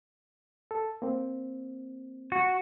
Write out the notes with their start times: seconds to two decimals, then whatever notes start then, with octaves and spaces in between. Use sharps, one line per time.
0.71 A4
1.02 A#3 C4
2.32 F#4